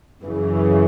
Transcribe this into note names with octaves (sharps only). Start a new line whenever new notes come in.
F#2 C#3 E3